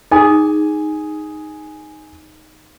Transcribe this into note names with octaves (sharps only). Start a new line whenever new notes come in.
D#4 G#4 G#5 D#6